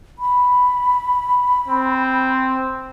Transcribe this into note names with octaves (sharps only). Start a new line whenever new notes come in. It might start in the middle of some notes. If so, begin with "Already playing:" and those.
B5
C4